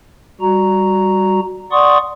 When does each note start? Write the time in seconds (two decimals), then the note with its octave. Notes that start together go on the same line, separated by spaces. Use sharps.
0.41 G3 F#4 A#5
1.71 D5 F#5 C6 C#6 D#6